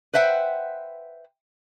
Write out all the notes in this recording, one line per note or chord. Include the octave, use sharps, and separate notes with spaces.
B4 C5 E5 F#5 G5